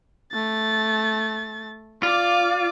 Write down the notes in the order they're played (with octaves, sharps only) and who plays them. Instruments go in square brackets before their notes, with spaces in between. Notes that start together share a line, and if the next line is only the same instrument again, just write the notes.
[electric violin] A3 A6
[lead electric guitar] F4 [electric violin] D5 D6